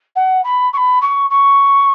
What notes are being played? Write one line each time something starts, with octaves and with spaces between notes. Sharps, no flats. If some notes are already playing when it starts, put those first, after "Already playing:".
F#5
B5
C#6
B5
C#6
C#6